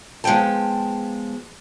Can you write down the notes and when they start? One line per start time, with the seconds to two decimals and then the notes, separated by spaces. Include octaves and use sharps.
0.24 F3 G#3 B3 G5 A5